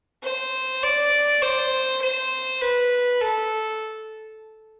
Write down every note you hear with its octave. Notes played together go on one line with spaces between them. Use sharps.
C5
D5
C5
C5
B4
A4